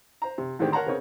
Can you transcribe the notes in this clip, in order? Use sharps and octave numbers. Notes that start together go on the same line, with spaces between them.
C5 A#5
C3
A2 D3 D#3 G#3 C4 G4
A#4 C#5 F#5 A5 A#5 C6
C#3 B3 C4 G#4 A#4 C#5